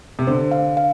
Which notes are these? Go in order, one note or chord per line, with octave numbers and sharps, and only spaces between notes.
C3
D3 C5
F5
F5